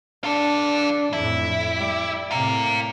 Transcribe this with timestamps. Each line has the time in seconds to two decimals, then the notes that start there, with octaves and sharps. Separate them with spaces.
0.24 D4 F4 A4
1.13 F2 A2 E4
1.77 G3
2.31 A2 C3 F4 A#4